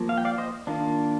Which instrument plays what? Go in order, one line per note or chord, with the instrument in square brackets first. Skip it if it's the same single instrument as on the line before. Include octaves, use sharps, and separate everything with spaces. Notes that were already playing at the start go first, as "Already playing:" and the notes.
Already playing: [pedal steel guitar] F3 A#3
F5
G5
D5 F5
C5 D#5
D#3 A#3 D4 F4